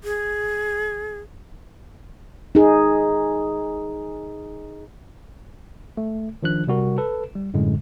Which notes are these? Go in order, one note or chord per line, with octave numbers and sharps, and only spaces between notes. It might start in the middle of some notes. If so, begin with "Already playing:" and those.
G#4
D#4 G#4
A3
D#3 F3 D4 F#6
C3 G3 F#4 A#4
A4 B4
G3
F#2 A2 D3 G#3